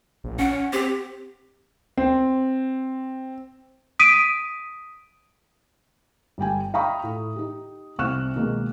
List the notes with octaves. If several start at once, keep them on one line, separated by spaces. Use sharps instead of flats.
A#1
C#4 F#5
C4 G4
C4
D#6 B6 D7 D#7
G1 G3 G5 G#5
F5 G5 A#5 B5 C#6 D#6
A2
D#4 G4
C2 C4 C#6 F6 F#6 E7
B2 D#3 G#3 A#3 D#4